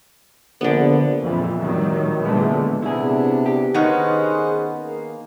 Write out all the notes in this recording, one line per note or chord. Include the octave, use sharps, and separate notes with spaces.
A#1 D3 B3
F2 A#2 E3
A2 D#3 F#3 G3
A#2 D3 E3 G#3 A3 B3
C3 B3 D4 E4 G#4
G4
D#3 B3 C#4 D#4 G#4 B4 C5 D#5
A#3